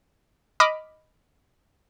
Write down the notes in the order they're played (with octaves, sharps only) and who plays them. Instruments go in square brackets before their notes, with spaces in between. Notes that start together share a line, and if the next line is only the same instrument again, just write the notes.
[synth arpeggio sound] D#5 B5 D6 F6